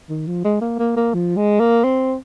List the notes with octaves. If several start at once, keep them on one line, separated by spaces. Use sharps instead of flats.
D#3
F3
G#3
A#3
A#3
A#3
F3
G#3
A#3
C4